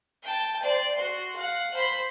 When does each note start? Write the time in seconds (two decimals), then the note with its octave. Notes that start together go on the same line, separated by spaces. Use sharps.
0.23 G5 A5
0.63 C5 D5
0.95 F#4 C6
1.36 F5 F#5
1.74 C5 B5